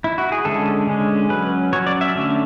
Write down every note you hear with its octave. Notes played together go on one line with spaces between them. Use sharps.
E4
F#4
G#4
D3 G#3 C#4 A4
D3 G#3 C#4
F#3 C#4 B4
F#3 C#4 C#5
D5
E5
D3 A3 C#4